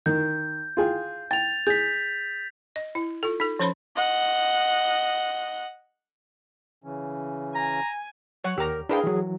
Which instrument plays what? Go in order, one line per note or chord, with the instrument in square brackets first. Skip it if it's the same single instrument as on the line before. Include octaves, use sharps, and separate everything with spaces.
[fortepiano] D#3 [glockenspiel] G6
[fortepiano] F4 G#4 G5
[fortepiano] G5 [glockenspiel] A6 F7
[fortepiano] G#4 [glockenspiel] G6 B6
[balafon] D#5
E4
F4 A4
D#4 A4
F3 C#4 C5 C#5 B5 C6
[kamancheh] D#5 F#5
[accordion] C#3 E3 C#4
[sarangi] G#5 [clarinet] A#5
[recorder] F#3 [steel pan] C#5 F#5
[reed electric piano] D#2 [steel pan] G4 A#5 [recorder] A#4
[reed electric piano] D4 B4 F5 [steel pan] E4 A#4 G5 [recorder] G#4
[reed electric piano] E3 F#3